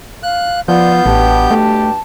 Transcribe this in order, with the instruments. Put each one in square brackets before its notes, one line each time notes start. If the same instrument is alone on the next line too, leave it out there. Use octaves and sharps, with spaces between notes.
[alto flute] F5 [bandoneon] F#6
[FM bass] F3 [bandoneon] B3 G6 [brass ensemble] F4 [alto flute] D5
[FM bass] A1 [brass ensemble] G2 B2 G4 [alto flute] A5
[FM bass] A3 [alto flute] A5